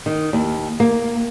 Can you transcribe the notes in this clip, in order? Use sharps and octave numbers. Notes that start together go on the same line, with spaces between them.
D#3
D#2
A#3